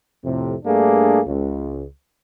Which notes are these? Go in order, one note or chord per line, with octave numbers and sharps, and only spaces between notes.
F2 A2 C3
G2 A3 A#3 D4 G#4
C#2